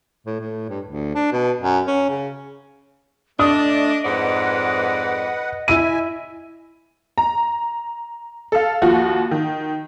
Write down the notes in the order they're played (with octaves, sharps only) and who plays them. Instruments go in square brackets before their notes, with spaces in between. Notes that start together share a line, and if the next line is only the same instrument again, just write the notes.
[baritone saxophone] A2
A2
G2
D2
D4
B2
F#2
C#4
C#3
[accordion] A3 D5 [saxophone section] D4 [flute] D#5 [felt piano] D#6
[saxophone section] F2 G#2 D5 [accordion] B4 F#5
[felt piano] E4 E6 D#7 [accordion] E5 G#5
[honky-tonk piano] A#5
A4 F5
D#2 F3 F4 F#4
D#3